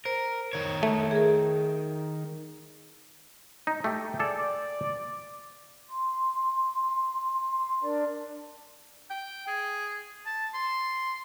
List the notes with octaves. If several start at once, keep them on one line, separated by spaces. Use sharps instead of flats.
A#4 C5
D#3 C#5
A3
G#4 A#4
D#4
A3 G4 G5
G#4 A4 D5
D5
C6
D4 A#4 D5
G5
G#4
A5
C6